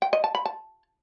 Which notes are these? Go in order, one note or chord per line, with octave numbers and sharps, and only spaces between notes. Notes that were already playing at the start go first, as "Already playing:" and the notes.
G5
D#5
A5
B5
A5